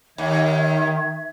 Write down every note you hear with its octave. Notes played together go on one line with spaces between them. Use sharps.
D#2 D#3 E5 G#6